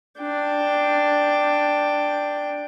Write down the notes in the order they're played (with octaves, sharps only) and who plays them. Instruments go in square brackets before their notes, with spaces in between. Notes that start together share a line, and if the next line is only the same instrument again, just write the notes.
[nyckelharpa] D4 G5